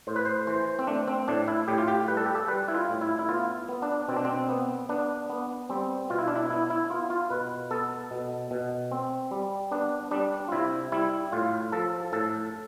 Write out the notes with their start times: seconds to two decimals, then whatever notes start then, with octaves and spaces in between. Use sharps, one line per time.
0.07 A2 C5
0.16 B4
0.25 C5
0.47 E3 C5
0.79 C4
0.87 A3 D4
1.08 C4
1.28 A2 D4
1.48 E4
1.68 A2 G4
1.78 F4
1.88 G4
2.08 G3 B4
2.17 A4
2.26 G4
2.35 A4
2.48 G3 B4
2.68 E4
2.75 F4
2.89 A2
3.01 E4
3.19 E4
3.29 B3 F4
3.69 B3
3.82 D4
4.08 B2 C4
4.16 D4
4.25 C4
4.49 B3
4.89 B3 D4
5.29 B3
5.69 G3 C4
6.10 B2 F4
6.18 E4
6.28 D4
6.36 E4
6.50 B3 E4
6.70 E4
6.90 B3 F4
7.10 F4
7.30 B2 B4
7.71 B3 A4
8.11 B2
8.51 B2
8.91 C4
9.31 G3
9.71 B3 D4
10.11 G3 D4
10.48 F4
10.52 C3 E4
10.92 G3 E4
11.32 A2 F4
11.72 F3 A4
12.12 A2 A4